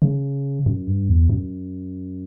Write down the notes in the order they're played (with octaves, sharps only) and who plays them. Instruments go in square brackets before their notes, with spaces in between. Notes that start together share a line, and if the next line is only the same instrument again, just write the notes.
[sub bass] C#3
F#2
G2
E2
F#2